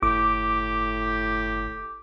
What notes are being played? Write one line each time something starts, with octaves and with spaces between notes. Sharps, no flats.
G1 A2 G4 D6